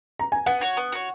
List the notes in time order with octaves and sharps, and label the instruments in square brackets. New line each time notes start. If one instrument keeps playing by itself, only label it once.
[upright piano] A#5
G#5
[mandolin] B3 [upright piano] F#5
[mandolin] F#4 C#5
B3
F#4 C#5